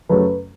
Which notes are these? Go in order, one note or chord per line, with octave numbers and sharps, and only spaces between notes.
F#2 C#3 F#3 A3 C#4 B4